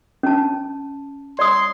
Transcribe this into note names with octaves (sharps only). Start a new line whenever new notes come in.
C#4 A5
D5 C6 D#6